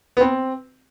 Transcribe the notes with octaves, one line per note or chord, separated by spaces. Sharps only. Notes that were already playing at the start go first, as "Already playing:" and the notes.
B3
C4